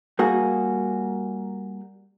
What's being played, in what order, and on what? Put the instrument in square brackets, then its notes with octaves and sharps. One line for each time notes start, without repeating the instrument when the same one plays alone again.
[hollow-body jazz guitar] G3 A#3 F#4 G#4